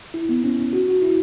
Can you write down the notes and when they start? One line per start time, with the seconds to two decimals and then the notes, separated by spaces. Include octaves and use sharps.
0.14 E4
0.29 B3
0.44 C#4
0.73 F#4
0.88 F#4
1.02 E4